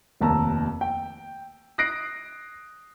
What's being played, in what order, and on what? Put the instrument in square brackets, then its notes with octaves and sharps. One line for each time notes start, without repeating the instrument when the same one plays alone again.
[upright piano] F1 D#2 A5 A#5 E6
G5
D#6 F#6 A#6 C7 D7